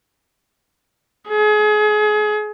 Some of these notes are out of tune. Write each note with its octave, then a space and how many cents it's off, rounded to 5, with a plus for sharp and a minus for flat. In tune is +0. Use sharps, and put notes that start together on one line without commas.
G#4 +30